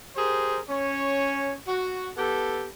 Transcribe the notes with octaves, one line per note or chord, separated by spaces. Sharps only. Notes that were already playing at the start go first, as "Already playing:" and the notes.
G4 G#4 A#4 C5
C#4 C#5
F#4
B3 G4 A4